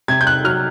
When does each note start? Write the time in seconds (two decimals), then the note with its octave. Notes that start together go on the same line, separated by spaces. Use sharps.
0.08 C3 G#6
0.21 G6
0.27 F#6
0.44 F#3 F6